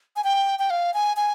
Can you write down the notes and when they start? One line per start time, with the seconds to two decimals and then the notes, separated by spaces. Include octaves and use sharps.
0.16 G#5
0.24 G5
0.59 G5
0.70 F5
0.94 G#5
1.17 G#5